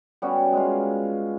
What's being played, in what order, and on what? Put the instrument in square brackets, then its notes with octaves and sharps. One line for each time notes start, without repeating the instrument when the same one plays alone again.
[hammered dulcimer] G3 B3 C#4 F#4
G#3 F4